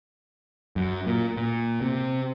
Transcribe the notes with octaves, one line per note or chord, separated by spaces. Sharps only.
F#2
A#2
A#2
C3